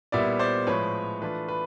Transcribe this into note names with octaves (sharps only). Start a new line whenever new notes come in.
A#2 G3 B3 E4 D5 E5
C5 D5
A2 F3 G#3 B4 C#5
E3 A3 D4 F4 B4
B4